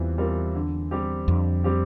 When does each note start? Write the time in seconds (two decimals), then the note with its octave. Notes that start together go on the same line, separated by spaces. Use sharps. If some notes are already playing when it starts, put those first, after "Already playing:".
Already playing: E2 E3 G3 C4 F4
0.18 G3 C4 F4 A#4
0.55 D3
0.91 G3 C4 G4
1.28 F2 D3
1.64 G3 C4 G4